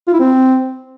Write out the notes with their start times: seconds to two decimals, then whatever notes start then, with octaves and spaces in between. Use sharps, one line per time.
0.07 F4
0.14 E4
0.20 C4